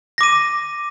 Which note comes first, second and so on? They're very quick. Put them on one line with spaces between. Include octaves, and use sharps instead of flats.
A#6 D6 D#7